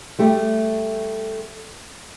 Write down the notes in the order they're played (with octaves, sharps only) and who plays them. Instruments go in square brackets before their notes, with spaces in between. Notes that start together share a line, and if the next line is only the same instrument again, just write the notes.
[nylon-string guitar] G3 A3 G4